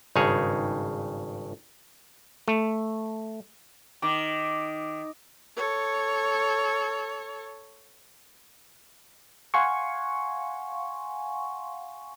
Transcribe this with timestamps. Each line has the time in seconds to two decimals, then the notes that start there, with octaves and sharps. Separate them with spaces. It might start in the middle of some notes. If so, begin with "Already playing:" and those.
0.16 G#1 G2 C#3 D#4 G#4 C#5
2.48 A3
4.02 D#3 D6
5.56 A4 C#5
9.54 F5 F#5 G#5 C6 C#6